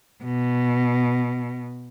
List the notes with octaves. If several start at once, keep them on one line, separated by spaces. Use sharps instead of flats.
B2